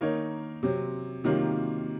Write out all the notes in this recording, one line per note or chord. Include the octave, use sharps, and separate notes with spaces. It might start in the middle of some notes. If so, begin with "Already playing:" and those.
D#3 A#3 D#4 A#4 C#5
C3 F#3 C4
C3 D#3 F#3 A#3 F4